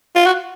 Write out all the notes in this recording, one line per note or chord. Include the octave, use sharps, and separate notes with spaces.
F4
F#4